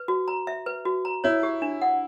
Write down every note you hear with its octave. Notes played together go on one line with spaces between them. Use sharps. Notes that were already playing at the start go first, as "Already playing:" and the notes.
Already playing: B4
F#4
A#5
E5
B4
F#4
A#5
E4 C#5
G4
D4
F#5